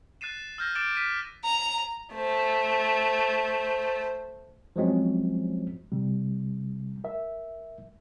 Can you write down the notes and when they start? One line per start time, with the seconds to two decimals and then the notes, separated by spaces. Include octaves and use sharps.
0.21 F#6 A6 C7 D#7 E7
0.58 E6 F6 G6 A#6
0.75 D6 E6 A6 D7 E7
0.95 F6 B6 D#7
1.45 A#5
2.14 A3 C5
4.76 F3 F#3 G#3 C4 C#4
5.92 C3 G3
7.04 A#4 E5